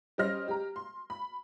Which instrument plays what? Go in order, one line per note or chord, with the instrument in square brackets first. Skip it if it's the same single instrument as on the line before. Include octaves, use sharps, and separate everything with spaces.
[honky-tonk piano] G3 C#4 C5 D#5 F6 A#6
G4 A#5
C6
B5